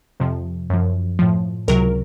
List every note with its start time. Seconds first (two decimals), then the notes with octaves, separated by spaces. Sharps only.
0.20 F2 C3 F3
0.70 F#2 F3
1.19 A2 F3
1.68 C#2 C3 F#3 A#4